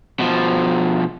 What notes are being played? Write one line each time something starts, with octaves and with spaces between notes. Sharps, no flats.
B2 F3